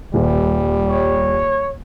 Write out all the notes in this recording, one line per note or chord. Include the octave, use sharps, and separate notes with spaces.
D#1 G3
C#5